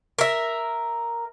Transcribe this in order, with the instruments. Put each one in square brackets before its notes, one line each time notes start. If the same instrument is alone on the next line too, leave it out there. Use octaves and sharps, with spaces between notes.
[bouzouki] A#4 E5